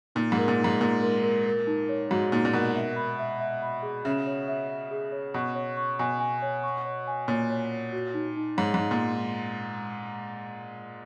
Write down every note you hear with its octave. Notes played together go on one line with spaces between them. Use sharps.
A#2 D#4
G#2
A#4
A#2
D#4
G#2
A#2 A#4
A#4
A#4
A#4
D#4
C#5
G#2 F#4
A#2 D#4
A#2
B2 A#4
E5
B5
E5
E5
B5
G#4
C#3 E5
C#5
E5
E5
G#4
C#5
B2 C#6
C#5
C#6
B2 G#5
G#5
C#5
C#6
C#5
G#5
A#2 C#5
C#5
C#5
F#4
D#4
D#4
G#2 C#5
G#2
D#4
A#2